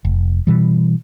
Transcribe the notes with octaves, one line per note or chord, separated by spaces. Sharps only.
F1
B2 E3 G3